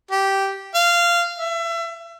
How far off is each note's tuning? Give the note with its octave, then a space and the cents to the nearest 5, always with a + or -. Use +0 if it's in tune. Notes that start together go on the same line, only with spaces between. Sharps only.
G4 -10
F5 -15
E5 +30